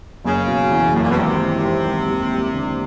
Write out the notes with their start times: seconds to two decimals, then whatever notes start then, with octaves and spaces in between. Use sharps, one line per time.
0.24 F#1 C#3
0.48 B2
0.71 E2
0.93 F#1 A2
1.03 A#2
1.10 B2
1.16 G#1 C3
1.40 E3
1.63 G#2
1.86 G#1
2.09 D#2
2.32 G3
2.54 D3